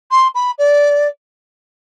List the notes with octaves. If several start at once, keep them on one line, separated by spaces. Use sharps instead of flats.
C6
B5
D5